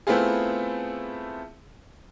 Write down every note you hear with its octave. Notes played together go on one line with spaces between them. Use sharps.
A3 B3 C4 E4 F4 G#4